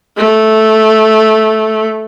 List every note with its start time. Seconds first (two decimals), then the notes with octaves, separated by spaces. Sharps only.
0.17 A3